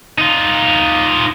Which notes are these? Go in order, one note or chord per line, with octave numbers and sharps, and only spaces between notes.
D#4 F4